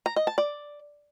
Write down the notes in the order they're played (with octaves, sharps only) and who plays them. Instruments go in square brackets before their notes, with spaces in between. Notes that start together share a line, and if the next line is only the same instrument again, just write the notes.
[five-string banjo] A#5
D#5
A5
D5